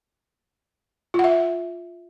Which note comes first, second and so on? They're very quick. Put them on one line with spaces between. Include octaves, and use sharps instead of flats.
F4 F#5 E5